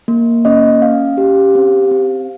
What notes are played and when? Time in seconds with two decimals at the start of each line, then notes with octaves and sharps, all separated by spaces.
0.08 A#3
0.45 C#4 D#5
0.82 C#4 F5
1.18 G4
1.55 C4
1.91 C4